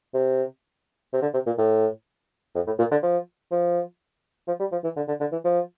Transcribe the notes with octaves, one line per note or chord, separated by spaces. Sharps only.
C3
C3
D3
C3
A#2
A2
F2
A2
A#2
D3
F3
F3
F3
G3
F3
E3
D3
D3
D3
E3
F3